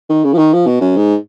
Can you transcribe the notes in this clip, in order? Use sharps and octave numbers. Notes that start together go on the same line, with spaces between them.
D#3
C#3
F3
D#3
F3
B2
F#2
G#2